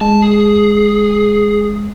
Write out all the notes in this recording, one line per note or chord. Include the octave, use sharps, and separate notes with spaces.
G#3 A5
G#4